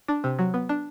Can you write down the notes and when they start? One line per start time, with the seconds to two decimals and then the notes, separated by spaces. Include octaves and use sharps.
0.08 D4
0.24 C3
0.39 F#3
0.54 B3
0.69 D4